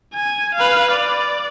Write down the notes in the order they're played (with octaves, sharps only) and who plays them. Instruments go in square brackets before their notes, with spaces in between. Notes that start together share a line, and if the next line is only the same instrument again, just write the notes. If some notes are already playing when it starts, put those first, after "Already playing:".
[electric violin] G#5
B4 F5
D5